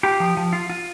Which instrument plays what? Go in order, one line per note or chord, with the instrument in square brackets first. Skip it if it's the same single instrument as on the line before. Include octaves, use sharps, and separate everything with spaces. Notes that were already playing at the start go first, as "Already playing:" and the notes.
[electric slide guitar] F4 G4
F3
F3
F4
F4